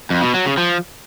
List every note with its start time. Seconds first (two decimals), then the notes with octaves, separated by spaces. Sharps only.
0.10 F2
0.22 B2
0.34 F#3
0.46 C#3
0.58 F3